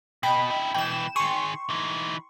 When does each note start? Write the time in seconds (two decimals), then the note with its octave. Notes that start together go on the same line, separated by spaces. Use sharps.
0.23 B2 D#5 G5 B5
0.50 D#4 E4
0.74 B2 E3 G5 E7
1.16 D#3 G#4 C6 C#6
1.70 E3 D#4